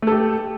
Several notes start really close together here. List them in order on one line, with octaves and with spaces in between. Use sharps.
A3 A4 G4